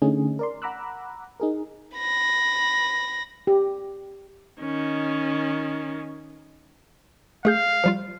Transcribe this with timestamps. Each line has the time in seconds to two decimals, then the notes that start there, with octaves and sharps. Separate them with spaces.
0.02 D3 A3 C#4 D#4 G#4
0.39 A#4 D5 C6
0.62 F#5 A#5 B5 D6 E6 F#6
1.40 D#4 G#4 A#4
1.96 B5 A#6
3.47 G4
4.60 D#3 C#4
7.45 A3 G#4 F5 G6
7.84 F3 G3 F4